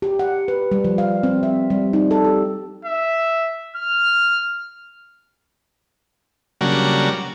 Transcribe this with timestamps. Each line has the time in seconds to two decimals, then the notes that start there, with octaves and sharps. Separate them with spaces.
0.02 G4
0.19 F#5
0.48 B4
0.71 G3
0.84 F3
0.98 F5
1.23 C4
1.43 E5
1.70 G3
1.93 D#4
2.11 A4
2.24 G4
2.85 E5
3.77 F6
6.61 C#3 F#3 G3 A#3 D4 F#4